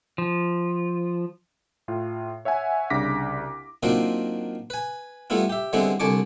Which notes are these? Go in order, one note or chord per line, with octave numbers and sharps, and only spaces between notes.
F3
A2 F4
C#5 E5 F#5 G#5
C2 C#3 D4 D6 A#6 B6
D#3 F#3 A#3 C4 D4 F4
B4 G#5
G3 A3 B3 E4 F4
G4 E5
D3 G3 G#3 B3 C4 E4
C2 D3 G#5 A5 C#6 D6